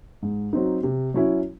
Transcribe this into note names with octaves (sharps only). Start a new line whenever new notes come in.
G#2
F#3 C4 D#4
C3
F#3 C#4 E4